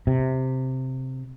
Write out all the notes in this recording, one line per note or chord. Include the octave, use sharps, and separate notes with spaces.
C3